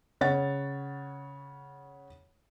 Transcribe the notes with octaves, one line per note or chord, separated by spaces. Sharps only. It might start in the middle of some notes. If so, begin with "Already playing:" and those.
C#3 C#5 F#5 A6